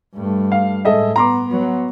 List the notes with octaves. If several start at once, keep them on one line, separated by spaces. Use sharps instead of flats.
G2 A3
F5
A2 G#3 A4 D#5 E5
B3 A#5 C6 D6
F#3 B3